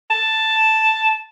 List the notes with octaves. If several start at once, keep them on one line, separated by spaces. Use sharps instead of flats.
A5